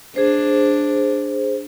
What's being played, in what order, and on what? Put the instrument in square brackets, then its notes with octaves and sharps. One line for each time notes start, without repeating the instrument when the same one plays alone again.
[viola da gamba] D4 [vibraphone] G#4 C5